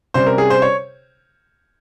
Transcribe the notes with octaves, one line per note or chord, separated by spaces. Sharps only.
C3 G3 C#4 C5
A#4
G#4
C5
C#5